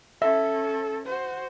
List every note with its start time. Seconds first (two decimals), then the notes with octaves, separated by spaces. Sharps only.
0.22 C#4 A4 E5
1.06 F#4 C5